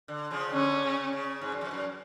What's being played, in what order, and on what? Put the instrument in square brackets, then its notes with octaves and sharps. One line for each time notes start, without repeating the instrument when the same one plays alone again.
[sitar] D3
C#3 F3
[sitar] D3 [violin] C#4
[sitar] C#3
C#3
G#2
F#2
F2
F#2